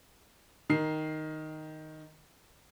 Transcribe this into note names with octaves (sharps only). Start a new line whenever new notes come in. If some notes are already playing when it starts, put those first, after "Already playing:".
D#3 C7